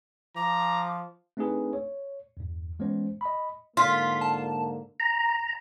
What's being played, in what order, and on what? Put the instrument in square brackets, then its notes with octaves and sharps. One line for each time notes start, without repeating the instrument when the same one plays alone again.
[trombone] F3 [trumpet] A#5 [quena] D6
[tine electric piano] A3 C4 D4 D#4 G#4 B4
C#5
E2 G2
E3 G#3 B3 C#4 C5
D#5 B5
[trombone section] G#2 D3 A#3 [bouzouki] F4 [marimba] C6 [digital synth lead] B6
[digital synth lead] A5
[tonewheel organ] A#5